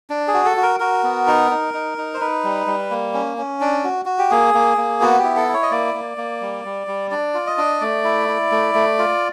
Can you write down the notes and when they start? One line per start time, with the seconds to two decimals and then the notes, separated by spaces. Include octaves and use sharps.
0.10 D4
0.28 G#4
0.34 F#4
0.45 A4
0.57 F#4
0.63 A#4
0.80 F#4 A#4
1.03 B3
1.27 D#4
1.51 D#4
1.74 D#4
1.98 D#4
2.14 C5
2.21 D#4 B4
2.44 G3
2.67 G3
2.91 A#3
3.14 C#4
3.38 C#4
3.61 D4
3.84 F#4
4.05 F#4
4.18 G4
4.30 A#3 G#4
4.54 A#3
4.77 A#3
5.01 B3 F#4
5.18 G4
5.24 E4
5.36 A4
5.48 E4
5.54 C#5
5.62 D#5
5.71 A#3 D5
5.94 A#3
6.18 A#3
6.41 G3
6.65 G3
6.87 G3
7.11 D4 D5
7.34 F4
7.47 D#5
7.58 D4
7.81 A3 D5
8.04 E4
8.29 E4
8.51 A3
8.75 A3
8.98 F4